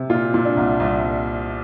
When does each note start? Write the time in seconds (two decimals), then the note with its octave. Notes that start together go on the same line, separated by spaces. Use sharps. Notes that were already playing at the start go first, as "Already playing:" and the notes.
Already playing: C3
0.10 A#2 F4
0.34 A#2
0.45 D4
0.57 C2
0.80 C2